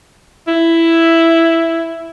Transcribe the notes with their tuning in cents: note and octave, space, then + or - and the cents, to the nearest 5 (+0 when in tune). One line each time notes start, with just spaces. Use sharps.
E4 +5